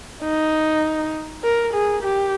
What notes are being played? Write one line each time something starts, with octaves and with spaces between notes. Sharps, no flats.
D#4
A#4
G#4
G4